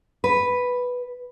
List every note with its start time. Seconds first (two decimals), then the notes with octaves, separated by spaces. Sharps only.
0.24 B4